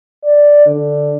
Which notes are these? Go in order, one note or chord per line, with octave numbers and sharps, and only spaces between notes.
D5
D3